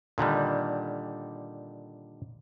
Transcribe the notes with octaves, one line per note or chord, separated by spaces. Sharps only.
A#2 D3 D#3 G3